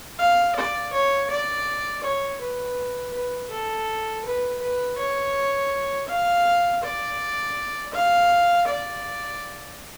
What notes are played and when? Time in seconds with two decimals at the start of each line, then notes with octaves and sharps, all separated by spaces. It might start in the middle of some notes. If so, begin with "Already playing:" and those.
0.19 F5
0.55 D5
0.93 C#5
1.30 D5
2.03 C#5
2.40 B4
3.13 B4
3.50 A4
4.25 B4
4.61 B4
4.98 C#5
6.08 F5
6.83 D5
7.93 F5
8.67 D5